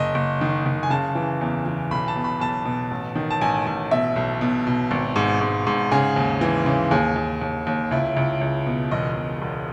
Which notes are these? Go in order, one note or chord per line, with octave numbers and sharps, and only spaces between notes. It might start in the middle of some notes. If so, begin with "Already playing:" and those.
Already playing: F#1 D#5
F#1
D#3
F#1
G#5
C#3 A5
E3
E2
E3
B1 B5
A5
B2
B5
B1 A5
B2
A1
D#3
A5
A1 G#5
A1 G#5
B2 E5
B1
B2
B2
G#1
G#2
G#2
G#2
C#3 G#4
D#2
E3
C#3
D#2 G#4
D#2
D#2
D#2
C#2 E4
C#2
C#2
B2
E1 D#5
E1
E1